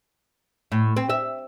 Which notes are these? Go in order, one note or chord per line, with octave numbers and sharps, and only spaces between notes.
A2
C4
E5